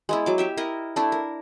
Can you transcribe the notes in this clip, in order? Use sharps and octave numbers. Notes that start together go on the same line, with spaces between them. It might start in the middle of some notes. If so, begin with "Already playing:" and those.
G#3 B3 E4
F#3 D6
G4 E5 G5
E4 A#4 D#5
A3 D4 E4
A#4